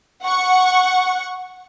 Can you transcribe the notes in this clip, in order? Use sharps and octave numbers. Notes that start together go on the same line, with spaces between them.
F#5 C#6